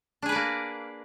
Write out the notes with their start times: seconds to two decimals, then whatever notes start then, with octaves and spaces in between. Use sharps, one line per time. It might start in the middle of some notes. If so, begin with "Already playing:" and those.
0.22 D4
0.26 G#4
0.29 B4
0.32 D5
0.35 A#3